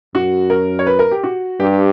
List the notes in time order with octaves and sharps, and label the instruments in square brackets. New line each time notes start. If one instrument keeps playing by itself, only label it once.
[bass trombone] F#2 [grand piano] F#4
[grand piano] A#4
C#5
B4
A#4
G4
F#4
[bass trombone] G2 [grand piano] G4